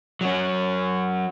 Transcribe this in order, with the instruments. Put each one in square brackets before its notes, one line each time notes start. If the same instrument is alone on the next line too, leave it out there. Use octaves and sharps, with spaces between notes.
[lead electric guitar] F#3 C#4